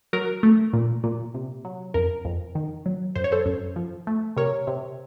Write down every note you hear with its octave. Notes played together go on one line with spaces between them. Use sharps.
F#3 A#4
A3
A#2
A#2
C3
F#3
F2 A#4
F2
D#3
F#3
F#2 C5
C#5
A4 C5
F#2
F3
A3
C3 A#4 C#5
C3